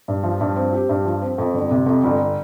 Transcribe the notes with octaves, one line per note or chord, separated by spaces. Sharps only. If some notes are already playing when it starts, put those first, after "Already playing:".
G2
F3
G2
C4
G4
G2
F3
C4
F2
G1
C3
F2
G1